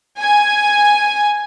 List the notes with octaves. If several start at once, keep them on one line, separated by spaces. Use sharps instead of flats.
G#5